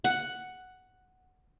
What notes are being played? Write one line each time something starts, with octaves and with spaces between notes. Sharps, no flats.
F#5